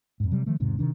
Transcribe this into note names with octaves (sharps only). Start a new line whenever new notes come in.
F2 G#2
C3 F#3 G3
D#3 F3 A3
E1 G#2 C3 D#3
C3 D#3 D4